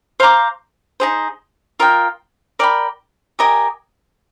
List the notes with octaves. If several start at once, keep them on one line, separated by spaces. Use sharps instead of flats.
C5 F5 A#5 D6
D#4 G#4 C5
F4 A#4 D#5 G5
A#4 D5 G5 B5
G4 A#4 D#5 G#5